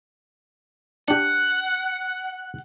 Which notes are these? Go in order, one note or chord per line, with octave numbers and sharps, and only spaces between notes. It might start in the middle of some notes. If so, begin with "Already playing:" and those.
D4 G4 F#5